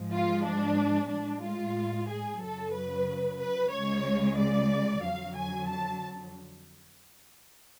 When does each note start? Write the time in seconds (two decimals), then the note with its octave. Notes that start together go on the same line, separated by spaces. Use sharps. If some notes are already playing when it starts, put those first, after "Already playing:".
Already playing: G#2 F3 G#3
0.12 F4
0.45 D4
1.09 A2 G#3 D4
1.43 F4
2.08 G#4
2.40 F#2 C#3 F#3 A4
2.73 B4
3.39 B4
3.72 C#2 C#3 G#3 C#5
4.37 D5
5.02 F2 D3 F#3 F5
5.35 G#5
5.68 A5